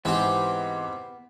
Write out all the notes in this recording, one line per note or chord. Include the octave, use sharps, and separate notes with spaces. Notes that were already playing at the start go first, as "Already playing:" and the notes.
G#2 E3 B3 C4 G4